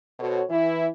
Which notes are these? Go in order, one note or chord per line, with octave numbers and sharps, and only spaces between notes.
B2 F#4 A4 C5 C#5
E3 E4